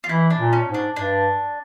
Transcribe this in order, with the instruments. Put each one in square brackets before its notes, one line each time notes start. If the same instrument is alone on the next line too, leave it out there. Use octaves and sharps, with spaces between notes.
[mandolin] F4
[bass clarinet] E3 [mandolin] E4
[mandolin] D4
[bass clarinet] A#2
[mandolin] C#4
[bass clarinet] G#2
[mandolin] D4
[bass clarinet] G2 [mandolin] D4